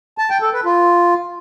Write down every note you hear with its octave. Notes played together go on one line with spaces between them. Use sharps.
A5
G5
A4
B4
F4